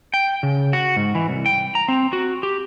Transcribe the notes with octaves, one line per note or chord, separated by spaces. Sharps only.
G5
C#3
F#4
G#2
E3
C2
G5
A#5
C4
F#4
G4